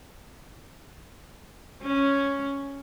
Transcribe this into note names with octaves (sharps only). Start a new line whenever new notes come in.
C#4